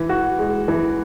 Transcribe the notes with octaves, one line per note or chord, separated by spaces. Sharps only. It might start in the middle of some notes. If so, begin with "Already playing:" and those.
Already playing: E3
F#4
G#3
E3